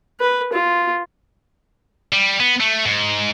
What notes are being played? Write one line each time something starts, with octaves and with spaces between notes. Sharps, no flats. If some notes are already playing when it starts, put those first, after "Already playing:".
B4
F4
G3
B3
A3
G#2